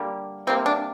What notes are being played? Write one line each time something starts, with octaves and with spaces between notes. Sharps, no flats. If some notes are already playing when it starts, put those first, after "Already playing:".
Already playing: D3 G3 A#3
C3 G3 A#3 C4
D4